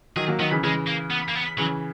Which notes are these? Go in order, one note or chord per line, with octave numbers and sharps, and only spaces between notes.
D#3 F#3 G#4
F#3 A#3
D#3 F#3 B3
C#3 E3
C#3 E3 G#3
A#3
B3
A#3
B3
C#3 E3 F#3